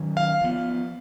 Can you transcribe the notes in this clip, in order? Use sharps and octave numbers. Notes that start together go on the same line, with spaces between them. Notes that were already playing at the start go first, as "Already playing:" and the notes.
Already playing: D#3 F#3 C#4
F5
F3 B3